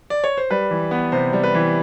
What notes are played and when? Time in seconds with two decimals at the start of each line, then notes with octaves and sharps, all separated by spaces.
0.10 D5
0.24 C#5
0.37 C5
0.51 G3 B4
0.71 E3
0.91 B3
1.12 C3 C5
1.33 G3
1.43 B4
1.54 E3